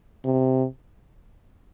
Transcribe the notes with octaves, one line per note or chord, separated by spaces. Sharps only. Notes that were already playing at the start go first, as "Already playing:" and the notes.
C3